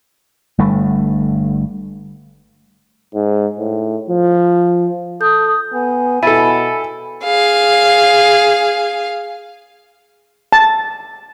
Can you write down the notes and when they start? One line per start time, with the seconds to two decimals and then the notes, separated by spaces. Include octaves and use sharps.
0.58 G1 G2 A3
3.14 G#2
3.58 A2
4.10 F3
5.21 A4 D#6 G6
5.73 B3 G#5
6.23 B2 E4 A4 B5 A6 D#7
7.24 G#4 F5
10.52 A5